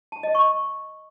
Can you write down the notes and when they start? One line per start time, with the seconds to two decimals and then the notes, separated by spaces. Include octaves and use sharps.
0.12 A5
0.23 D#5
0.35 C#6